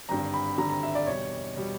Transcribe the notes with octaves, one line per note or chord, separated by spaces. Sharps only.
G#1 G2 D3 A#5
B5
G#1 G2 D3 A#5
A#5
E5
D5
E2 B2 G3 C#5
B2 G3